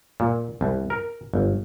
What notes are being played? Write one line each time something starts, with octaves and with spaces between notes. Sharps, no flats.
A#2
C2
A#4
G1